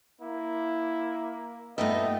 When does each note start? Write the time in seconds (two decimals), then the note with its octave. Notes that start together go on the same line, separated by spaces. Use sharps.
0.21 A#3 E4
1.78 G2 A#2 A3 B3 D#4 D#5 E5